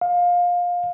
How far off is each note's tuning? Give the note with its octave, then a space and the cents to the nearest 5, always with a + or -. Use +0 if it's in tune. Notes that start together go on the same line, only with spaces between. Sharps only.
F5 +20